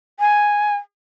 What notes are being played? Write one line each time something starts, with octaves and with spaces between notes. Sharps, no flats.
G#5